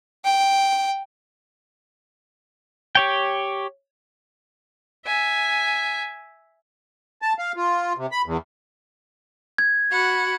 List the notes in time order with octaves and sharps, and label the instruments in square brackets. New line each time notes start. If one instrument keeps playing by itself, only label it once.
[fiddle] G5
[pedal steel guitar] G4 C#5 G5
[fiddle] E5 G#5
[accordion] A5
F5
F4
C3
B5
E2
[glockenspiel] G#6
[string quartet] F#4 F#5 B5